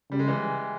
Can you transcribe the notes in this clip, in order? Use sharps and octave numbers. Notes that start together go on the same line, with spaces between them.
C#3 G3
G#3
E3 G3